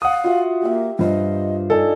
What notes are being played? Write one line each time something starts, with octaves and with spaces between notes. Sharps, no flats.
F5 F#5 D#6
F4 F#4 E5
A#3 G4 E5
G2 F4 C5 D#5
D4 D#4 A4 G#5